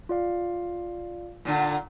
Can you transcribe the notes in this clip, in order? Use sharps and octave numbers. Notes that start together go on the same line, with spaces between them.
F4 D5 F5
A#2 D3